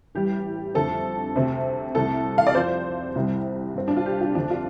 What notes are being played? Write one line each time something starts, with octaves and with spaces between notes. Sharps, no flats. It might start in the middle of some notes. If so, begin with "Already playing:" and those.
A1 A2 G3 G4
F2 D3 A3 C4 A4
D2 C3 A3 C4
C2 C3 A3 A4
F5
D5
F2 F3 C4 C5
C2 C3 G3 C4
G2 G3 C4
D4
F4
G4
F4
F2 D3 A3 C4 D4
F4